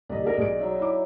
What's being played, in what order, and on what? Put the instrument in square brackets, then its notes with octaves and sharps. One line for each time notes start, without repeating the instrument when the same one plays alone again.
[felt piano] D#1 C2 [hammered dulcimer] D5 D#5
[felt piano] G#4 A#4
B1 G#4 D7
[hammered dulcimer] F#3 D#4 E5
[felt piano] E4 D6